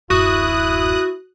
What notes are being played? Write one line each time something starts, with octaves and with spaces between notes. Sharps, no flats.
D1 F#2 E4 F#4 D#6 F#6